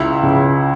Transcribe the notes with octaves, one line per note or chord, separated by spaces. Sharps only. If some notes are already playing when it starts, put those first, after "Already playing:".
Already playing: C#2 E4
C#3